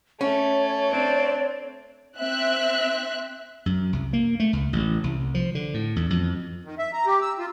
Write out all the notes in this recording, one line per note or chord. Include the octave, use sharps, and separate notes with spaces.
A3 C#4 C#5
C4 D4
C4 E5 F#6
F#2
C2
A#3
A3
C#2
A1
C2
F3
D3
A2
E2
F2
D#3
E5
A#5
G4
E6
F4